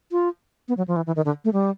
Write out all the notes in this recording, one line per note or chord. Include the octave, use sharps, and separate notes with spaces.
F4
B3
F#3
F3
E3
E3
D#3
D3
A3
G3